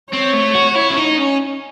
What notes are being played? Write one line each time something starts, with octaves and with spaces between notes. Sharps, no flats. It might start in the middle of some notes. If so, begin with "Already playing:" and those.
C4 C#5
A3
F#4
E4
C#4
D#4
C#4